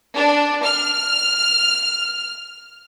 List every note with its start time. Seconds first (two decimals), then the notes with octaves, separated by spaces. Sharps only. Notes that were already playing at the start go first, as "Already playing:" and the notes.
0.18 D4
0.64 F6